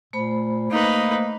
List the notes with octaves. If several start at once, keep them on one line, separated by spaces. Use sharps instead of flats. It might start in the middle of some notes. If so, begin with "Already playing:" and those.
A#2 A3 C5 B5
A#3 D#4 B4